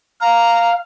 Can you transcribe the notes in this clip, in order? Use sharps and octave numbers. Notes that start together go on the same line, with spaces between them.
F5 A#5